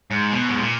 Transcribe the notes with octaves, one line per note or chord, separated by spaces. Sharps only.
G#2
B2
G#2
A#2